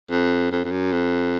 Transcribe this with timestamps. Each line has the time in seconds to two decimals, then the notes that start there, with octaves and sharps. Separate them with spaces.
0.10 F2
0.51 F2
0.64 F2
0.71 F#2
0.92 F2